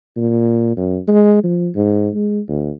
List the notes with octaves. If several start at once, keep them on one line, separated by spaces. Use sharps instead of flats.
A#2
F#2
G#3
F3
G#2
G#3
D2